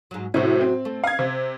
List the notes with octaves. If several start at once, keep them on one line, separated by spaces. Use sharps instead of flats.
G#2 F#3
A2 C3 F#3 F#4
C4
A3
D#5 F5 G#6
C3